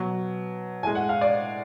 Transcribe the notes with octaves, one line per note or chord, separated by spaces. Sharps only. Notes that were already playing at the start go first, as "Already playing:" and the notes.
Already playing: B2 F#3
A2 G#3 G#5
F#5
F5
D5